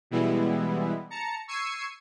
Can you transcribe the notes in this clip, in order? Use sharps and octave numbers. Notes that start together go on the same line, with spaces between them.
B2 E3 G3 G#3 B3 E4
A5 A#5 C#7
C#6 E6 G#6 C7 C#7 D#7